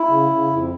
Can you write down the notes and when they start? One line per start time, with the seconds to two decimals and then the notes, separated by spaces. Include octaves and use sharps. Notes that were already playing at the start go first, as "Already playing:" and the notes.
Already playing: E4
0.09 C#3
0.30 C#3
0.50 F2